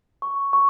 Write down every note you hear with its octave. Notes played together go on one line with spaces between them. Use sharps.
C#6
C#6